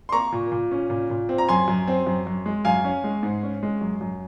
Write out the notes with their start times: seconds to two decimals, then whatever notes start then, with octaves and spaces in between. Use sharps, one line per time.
0.09 C6
0.12 A#3 A#5 C#6
0.32 A#2
0.51 A#2
0.71 C#4
0.90 A#2
1.10 A#2
1.29 C4
1.38 A#5
1.49 F#2 G#5 C6
1.68 F#2
1.87 C4
2.07 F#2
2.27 F#2
2.46 G#3
2.65 F#2 F5 G#5
2.84 C#4
3.04 G#3
3.23 G#2
3.43 C#4
3.63 G#3
3.81 F#2
4.01 F#2